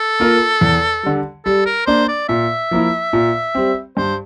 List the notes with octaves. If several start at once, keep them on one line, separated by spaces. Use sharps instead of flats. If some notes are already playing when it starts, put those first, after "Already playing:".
Already playing: A4
A#3 F4 A#4
E2
D3 G3
G3 A4
A#4
A#3 D4 C5
D5
A#2 E5
F3 A#3 E4
A#2
G3 C4
G2 C5